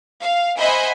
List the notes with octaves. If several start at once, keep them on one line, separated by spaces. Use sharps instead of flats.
F5
C5 D#5 E5 F#5 G#5 B5